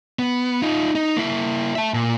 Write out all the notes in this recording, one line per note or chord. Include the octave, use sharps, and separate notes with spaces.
B3
D#4 F4
D#4
A#3 E4
E5 A5
A#2